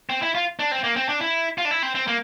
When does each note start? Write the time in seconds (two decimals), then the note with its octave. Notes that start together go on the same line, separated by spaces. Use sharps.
0.10 C4
0.22 E4
0.35 F4
0.59 D4
0.72 C4
0.84 A#3
0.96 C4
1.09 D4
1.21 E4
1.58 F4
1.65 D4
1.71 E4
1.83 C4
1.95 C4
2.08 A#3